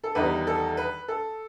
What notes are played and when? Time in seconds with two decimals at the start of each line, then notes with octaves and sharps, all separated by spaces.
0.04 A4
0.15 E2 D#3 G3 D#4 B4
0.47 A4
0.77 B4
1.08 A4